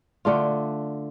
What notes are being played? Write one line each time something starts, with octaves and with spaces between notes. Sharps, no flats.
D3 A3 F4